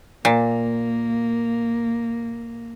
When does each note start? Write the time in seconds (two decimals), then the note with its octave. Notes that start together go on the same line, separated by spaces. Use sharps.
0.25 A#2 A#3